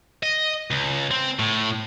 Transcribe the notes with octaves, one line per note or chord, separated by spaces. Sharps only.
D#5
C#2
C4
A2